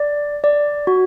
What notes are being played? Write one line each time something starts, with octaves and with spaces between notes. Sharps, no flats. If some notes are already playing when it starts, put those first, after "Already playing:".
Already playing: D5
D5
F#4